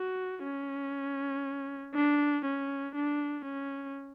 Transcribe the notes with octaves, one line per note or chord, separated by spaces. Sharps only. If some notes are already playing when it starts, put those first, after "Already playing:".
Already playing: F#4
C#4
D4
C#4
D4
C#4